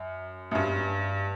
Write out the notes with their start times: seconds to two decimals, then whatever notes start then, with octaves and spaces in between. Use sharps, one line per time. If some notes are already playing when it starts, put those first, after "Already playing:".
Already playing: F#2
0.51 F#2
0.55 G2